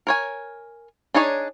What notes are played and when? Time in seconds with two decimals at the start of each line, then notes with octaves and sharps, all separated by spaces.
0.07 A#4 C#5 G#5
1.14 D4 D#4 G#4 C#5 D5